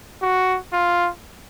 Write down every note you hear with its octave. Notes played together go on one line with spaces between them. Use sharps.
F#4
F4